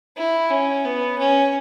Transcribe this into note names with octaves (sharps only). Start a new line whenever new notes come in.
E4
C#4
B3
C#4